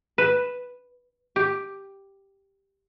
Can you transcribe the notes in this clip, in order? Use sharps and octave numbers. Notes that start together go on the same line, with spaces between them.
B4
G4